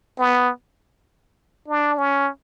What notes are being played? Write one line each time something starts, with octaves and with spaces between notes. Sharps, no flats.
B3
D4
C#4